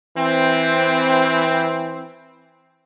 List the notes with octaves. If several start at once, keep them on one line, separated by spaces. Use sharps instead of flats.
E3 C4